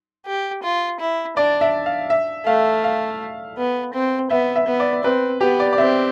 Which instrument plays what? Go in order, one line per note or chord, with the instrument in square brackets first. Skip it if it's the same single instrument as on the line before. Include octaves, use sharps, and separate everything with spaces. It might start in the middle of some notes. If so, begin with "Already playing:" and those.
[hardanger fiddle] G4
F4
E4
[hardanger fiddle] D4 [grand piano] D5
[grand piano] E5
F5
E5
[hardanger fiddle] A3 [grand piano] F5
[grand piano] F5
[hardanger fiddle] B3
C4
[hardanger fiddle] B3 [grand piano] E5
[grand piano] E5
[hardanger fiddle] B3
[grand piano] D5
[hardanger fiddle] C4 [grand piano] B4
[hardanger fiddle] B3 [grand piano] G4
[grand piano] D5
D5
[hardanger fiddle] C4 [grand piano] E5